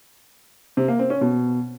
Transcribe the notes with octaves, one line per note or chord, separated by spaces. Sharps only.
C3
A#3
C4
C#4
B2